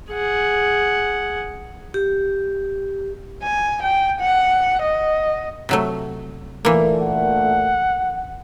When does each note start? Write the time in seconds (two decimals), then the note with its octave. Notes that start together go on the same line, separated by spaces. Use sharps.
0.10 G#4 F#5
1.94 G4
3.43 G#5
3.83 G5
4.21 F#5
4.82 D#5
5.69 C3 F#3 A3
6.65 D2 A#2 E3 A3 A#3
7.02 F#5